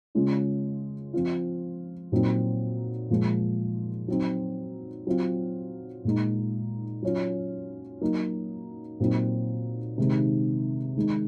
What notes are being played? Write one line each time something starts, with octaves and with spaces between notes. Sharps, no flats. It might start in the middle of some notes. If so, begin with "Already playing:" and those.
C#3 G#3 C#4 F4
F3 C4 F4
A#2 F#3 C4 D#4
A#2 F3 G#3
F#3 C4 D#4
F#3 C4 F4
A#2 G#3 D#4
F#3 C#4 F4
F#3 A#3 D#4
A#2 F#3 C4 D#4
C3 D#3 G#3 D#4
D#3 G#3 D#4